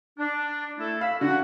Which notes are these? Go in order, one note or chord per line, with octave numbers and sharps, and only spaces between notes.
D4
A3 E4 A4
F5 B5 E6
D3 F#4 F#5